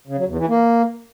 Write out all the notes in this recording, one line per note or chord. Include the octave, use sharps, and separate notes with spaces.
C#3
F#3
E2
E3
A#3